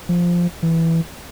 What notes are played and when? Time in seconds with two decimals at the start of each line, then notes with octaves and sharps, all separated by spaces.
0.09 F3
0.63 E3